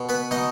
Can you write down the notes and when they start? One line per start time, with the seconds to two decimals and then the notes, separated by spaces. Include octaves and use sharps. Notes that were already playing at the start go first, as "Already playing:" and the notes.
Already playing: B2
0.09 B3 B4
0.31 B2 D#4 D#5